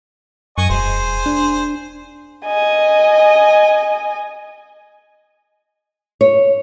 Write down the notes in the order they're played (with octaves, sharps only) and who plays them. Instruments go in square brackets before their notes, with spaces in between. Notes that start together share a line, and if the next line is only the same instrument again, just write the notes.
[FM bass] F#2 [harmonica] D#5 G#5 C#6
[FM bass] E1 [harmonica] G#4 C5
[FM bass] D4
[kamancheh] D#5 G#5
[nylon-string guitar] C#5